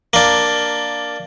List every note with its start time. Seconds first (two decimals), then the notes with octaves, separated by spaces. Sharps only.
0.13 A#3 D4